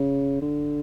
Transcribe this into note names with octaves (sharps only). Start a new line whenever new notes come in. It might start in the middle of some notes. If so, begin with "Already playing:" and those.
Already playing: C#3
D3